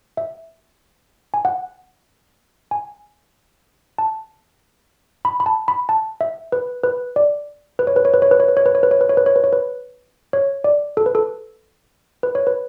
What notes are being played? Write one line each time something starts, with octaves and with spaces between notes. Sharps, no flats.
E5
G#5
F#5
G#5
A5
B5
B5
A5
B5
A5
E5
B4
B4
D5
B4
C#5
B4
C#5
B4
C#5
B4
C#5
B4
C#5
B4
C#5
B4
C#5
B4
C#5
B4
C#5
B4
C#5
B4
C#5
D5
A4
B4
A4
B4
C#5
B4